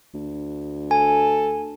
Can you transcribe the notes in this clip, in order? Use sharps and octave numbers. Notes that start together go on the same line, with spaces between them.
D2
A4 G#5